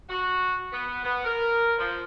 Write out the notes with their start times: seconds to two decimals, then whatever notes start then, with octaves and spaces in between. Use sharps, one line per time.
0.09 F#4
0.72 B3
1.04 B3
1.25 A#4
1.78 F3